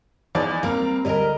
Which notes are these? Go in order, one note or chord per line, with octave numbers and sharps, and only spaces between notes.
E2 E3 F3 D#4 D5
G3 A#3 C4 A#5
D2 G3 A#4 D#5 A#5